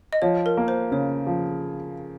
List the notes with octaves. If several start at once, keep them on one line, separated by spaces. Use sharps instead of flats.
D#5
F3 C#5
A#4
A#3
C5
C#3 C#5
F3